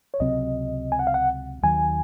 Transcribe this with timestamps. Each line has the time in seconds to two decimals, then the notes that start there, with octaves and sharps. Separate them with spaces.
0.14 C#5
0.20 C#2 C3 F#3 C4 D#5
0.92 G#5
0.99 F#5
1.07 F5
1.14 F#5
1.63 D#2 D#3 F#3 G#5